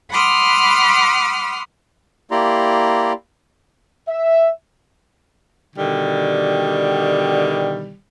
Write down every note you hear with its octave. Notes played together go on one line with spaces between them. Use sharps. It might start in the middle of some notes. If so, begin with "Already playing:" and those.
F#5 B5 C6 D6 D#6 F6
A#3 E4 G4 D5 A#5 C6
E5
B2 D3 D#3 G3